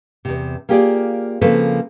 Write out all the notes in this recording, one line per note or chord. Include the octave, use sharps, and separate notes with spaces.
E2 C3
A#3 F4 G4 G#4 D5
C#3 F3 A#3 C4 A4 B4